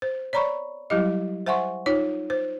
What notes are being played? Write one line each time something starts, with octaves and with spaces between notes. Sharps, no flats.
C5
C#5 D5 A#5 B5 C#6
F#3 G3 E4 G4 D#5
C5 E5 F#5 G#5 C6 C#6
D#4 F4 C#5
C5